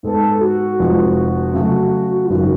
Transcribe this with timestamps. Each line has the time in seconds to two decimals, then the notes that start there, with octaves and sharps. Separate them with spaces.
0.03 G#2 G#3 B3 A4
0.41 F#4
0.79 F1 F2 F3 G#3
1.54 C#3 F#3 A3
2.24 F4
2.30 G#1 F#2 C#3 F#4